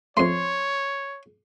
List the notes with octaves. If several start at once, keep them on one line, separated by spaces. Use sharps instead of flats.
F2 A3 C#5 C6